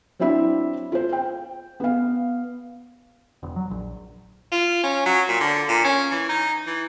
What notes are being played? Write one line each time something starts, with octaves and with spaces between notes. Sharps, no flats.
F#3 C4 D4 E4 E5
F4 C5
G5
B3 F5
E1
F#3
A#1
F4
C#4
F#3
A#2
D3
A#2
C#4
E3
D#4
E3